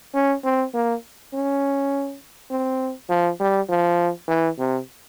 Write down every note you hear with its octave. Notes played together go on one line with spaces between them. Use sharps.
C#4
C4
A#3
C#4
C4
F3
G3
F3
E3
C3